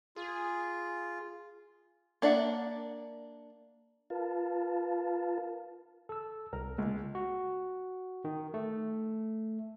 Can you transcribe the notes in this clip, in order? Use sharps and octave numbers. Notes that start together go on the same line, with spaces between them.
F4 G#4
A#3 D4 D5 E5 F#5
F4 A#4 B4 F5 A5
A4 E6
C2 A#4
C#2 G#3
F#4
D#3
A3